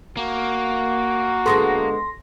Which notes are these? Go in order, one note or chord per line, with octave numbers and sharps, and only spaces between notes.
A#3 F#4
D3 G#3 B3 A4 C6 A#6